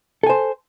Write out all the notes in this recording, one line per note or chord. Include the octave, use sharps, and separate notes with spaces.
A4 C5 G#5